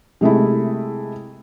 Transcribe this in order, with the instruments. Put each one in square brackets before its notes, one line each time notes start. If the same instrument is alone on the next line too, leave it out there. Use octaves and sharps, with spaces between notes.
[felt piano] C3 G#3 A3 E4